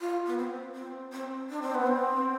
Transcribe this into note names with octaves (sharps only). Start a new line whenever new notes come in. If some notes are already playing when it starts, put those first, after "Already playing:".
F4
B3
C4
C4
C4
D4
C4
B3
C4